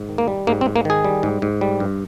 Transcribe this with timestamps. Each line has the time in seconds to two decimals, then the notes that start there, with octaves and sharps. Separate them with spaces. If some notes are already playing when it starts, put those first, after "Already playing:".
Already playing: G#2
0.09 D#3
0.18 A#3
0.28 G3
0.47 G#2 A#3
0.61 C4
0.66 G#2
0.76 A#3
0.85 D#3 G#4
1.04 G3
1.23 G#2
1.42 G#2
1.61 G3
1.80 G2